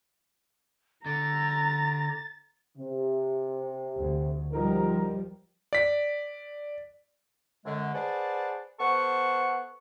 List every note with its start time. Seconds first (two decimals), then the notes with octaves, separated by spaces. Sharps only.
1.06 D3 A#5 A6
2.78 C3
3.95 D2
4.53 F3 G3 D#4 F#4 A#4
5.73 D5 B6
7.65 F#2 D3 G#3
7.93 G#4 B4 C5 D5 F#5 A5
8.79 B3 A4 C5 F#5 C#6